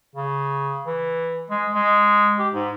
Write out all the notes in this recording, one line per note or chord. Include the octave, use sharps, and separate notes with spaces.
C#3
E3
G#3
G#3
G4
G#2